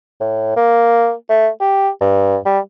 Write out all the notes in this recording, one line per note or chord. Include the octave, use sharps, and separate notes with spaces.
A2
A#3
A3
G4
G2
G3